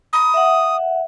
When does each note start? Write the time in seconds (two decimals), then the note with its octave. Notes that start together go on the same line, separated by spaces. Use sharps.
0.13 A#5 B5 D#6
0.34 E5 F#5